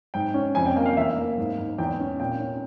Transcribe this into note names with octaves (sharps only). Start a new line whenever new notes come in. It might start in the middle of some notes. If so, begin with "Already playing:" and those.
G#2 G5
C#4
F2 G#5
G5
A#3 G5
F5
E2 E5
A#3
G#2
G#2
E2 G5
C#4
A#2 G5
C#4